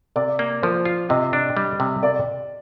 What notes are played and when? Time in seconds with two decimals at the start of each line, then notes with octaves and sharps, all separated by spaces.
0.16 C3 D5
0.39 A#3
0.63 F3 C5
0.85 F4
1.09 C3 D#5
1.33 D4
1.57 G3
1.80 C3
2.03 D5